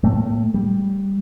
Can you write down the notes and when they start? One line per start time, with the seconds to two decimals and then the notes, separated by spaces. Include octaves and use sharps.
0.03 A2 A3 A#3
0.54 G3